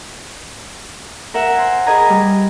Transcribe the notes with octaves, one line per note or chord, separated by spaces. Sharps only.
A#4 E5 F#5
C5 G#5
G#4 A#4 B4 D#5 G#5 A#5
G3